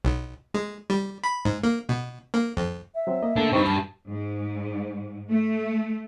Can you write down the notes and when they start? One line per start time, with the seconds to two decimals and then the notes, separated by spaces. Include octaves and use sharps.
0.05 B1
0.54 G#3
0.90 G3
1.24 B5
1.45 G#2
1.64 A#3
1.89 B2
2.34 A#3
2.57 F2
2.95 E5
3.07 F#3 C4
3.22 A#3 D#5
3.36 A3 A#3 D4 A4
3.52 G2 C4 D#4 C#6
3.66 F#2 A5
4.07 G#2
5.29 A3